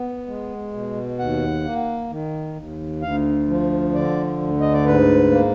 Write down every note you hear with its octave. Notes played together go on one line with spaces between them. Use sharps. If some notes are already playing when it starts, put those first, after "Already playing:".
Already playing: B3
G#3
B2
D#2 F#5
A#3
D#3
D#2
D2 F5
F3
D3 D5
D2
D#5
D5
G#2 B4
A#3